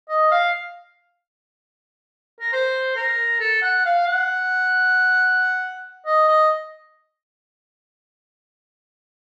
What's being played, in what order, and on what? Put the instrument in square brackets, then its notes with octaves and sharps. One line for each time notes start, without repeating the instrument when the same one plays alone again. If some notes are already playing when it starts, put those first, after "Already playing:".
[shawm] D#5
F5
A#4
C5
A#4
A4
F#5
F5
F#5
D#5
D#5